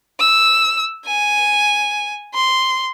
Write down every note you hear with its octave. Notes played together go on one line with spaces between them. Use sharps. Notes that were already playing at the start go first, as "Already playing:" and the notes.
E6
G#5
C6